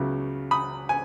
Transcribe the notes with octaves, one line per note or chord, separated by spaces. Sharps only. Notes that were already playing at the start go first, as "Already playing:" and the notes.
Already playing: C#2 C#3 F#3 B3 E4
B5 D#6
G#5